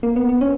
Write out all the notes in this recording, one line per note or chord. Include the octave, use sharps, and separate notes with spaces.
A#3
B3
B3
C#4